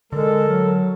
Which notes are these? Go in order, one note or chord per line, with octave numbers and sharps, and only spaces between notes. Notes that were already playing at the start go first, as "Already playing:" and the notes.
D3 G#3 A4 A#4
F#3